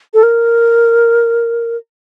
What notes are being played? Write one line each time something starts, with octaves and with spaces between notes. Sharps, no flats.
A4
A#4